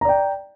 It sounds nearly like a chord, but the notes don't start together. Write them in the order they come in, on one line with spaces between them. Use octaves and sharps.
A#5 D5 G5